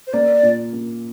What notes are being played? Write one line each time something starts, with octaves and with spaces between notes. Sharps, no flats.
C5
A#3 D5
A#2
A#3